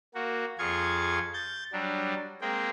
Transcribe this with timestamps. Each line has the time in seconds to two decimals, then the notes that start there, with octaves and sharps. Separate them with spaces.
0.15 A#3 F#4
0.59 F2 F4 G#4 F5 C#6 G#6
1.34 G6 A6
1.73 F#3 G3 D4
2.41 G#3 A#3 C4 G#4 G5